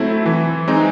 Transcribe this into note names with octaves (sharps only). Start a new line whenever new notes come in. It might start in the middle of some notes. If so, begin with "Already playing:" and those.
Already playing: F#3 A3 C4 E4
E3
G#3 C4 D#4